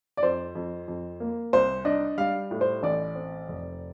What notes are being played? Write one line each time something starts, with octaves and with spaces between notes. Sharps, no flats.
D5
F2 C5
F2
F2
A#3
C2 C5
D4 D#5
G3 F5
A2
C5
A1 D5
C4
F1